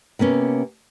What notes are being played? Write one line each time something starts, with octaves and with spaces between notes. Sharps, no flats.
C3 A#3 B3 C#4